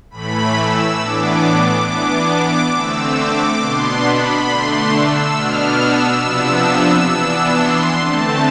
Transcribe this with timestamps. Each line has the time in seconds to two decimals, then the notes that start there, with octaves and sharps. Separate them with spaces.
0.10 A2 E3 A3 B5
0.54 E6
0.98 A2 E3 B3 D4 D6
1.86 E3 B3 D4 D6
2.29 D6
2.73 D3 A3 C4 E6
3.16 D6
3.59 B2 B3 D4 C6
4.04 B5
4.47 D3 A3 D4 C6
4.91 E6
5.34 B2 B3 D4 F6
5.78 E6
6.22 C3 F3 B3 D4 E6
7.09 E3 B3 D4
7.53 C6
7.96 D3 A3 C4 A5